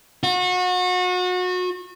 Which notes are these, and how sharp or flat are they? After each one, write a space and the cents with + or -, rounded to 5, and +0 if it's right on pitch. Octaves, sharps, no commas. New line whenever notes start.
F#4 -30